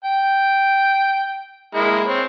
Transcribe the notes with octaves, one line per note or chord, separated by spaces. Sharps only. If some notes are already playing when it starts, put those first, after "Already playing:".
G5
G#3 A#3 E4
C4 C#5